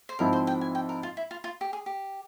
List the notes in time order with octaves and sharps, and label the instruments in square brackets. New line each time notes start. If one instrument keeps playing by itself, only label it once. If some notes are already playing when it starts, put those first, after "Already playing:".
[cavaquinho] C5
[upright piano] G#2 F3 C4 E4 [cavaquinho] A#4
[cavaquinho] C5
G5
G#5
G5
A#4
F4
E4
F4
F4
G4
G#4
G4